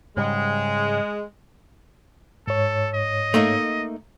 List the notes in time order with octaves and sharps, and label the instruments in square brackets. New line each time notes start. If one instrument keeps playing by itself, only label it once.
[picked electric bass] G#2 C#3 G3 [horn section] G#3
[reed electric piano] G#2 C#5 [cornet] A4
[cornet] D#5
[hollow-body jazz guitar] A3 A#3 D#4